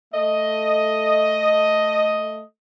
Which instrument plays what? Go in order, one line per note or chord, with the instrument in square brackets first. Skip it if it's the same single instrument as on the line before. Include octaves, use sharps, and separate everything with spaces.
[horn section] A3 D#5